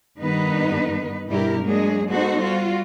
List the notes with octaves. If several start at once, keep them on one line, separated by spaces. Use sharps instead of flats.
G2 D#3 B3 D#4 B4
G2 B2 G3 E4 G4 A#4
F#3 G#3 A#3 D4 G#4
G#3 B3 D#4 F#4 A4 C5
G3 F4 F#4